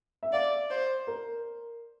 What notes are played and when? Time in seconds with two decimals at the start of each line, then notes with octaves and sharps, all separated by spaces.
0.23 E5
0.33 D5 F5
0.70 C5
1.07 A#4